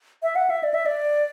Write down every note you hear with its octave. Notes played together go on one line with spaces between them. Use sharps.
E5
F#5
E5
D5
E5
D5